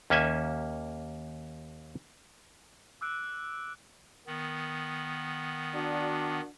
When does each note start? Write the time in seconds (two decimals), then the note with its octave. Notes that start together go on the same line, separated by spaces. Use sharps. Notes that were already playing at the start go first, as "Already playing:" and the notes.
0.10 D#2 A#3 C#4 E5 G#5
3.01 D6 E6 F#6 D7
4.27 D#3 B3
5.75 D4 F#4